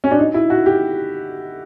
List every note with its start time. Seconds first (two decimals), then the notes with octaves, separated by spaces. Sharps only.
0.04 C#4
0.11 D4
0.19 D#4
0.34 E4
0.50 F#4
0.66 G4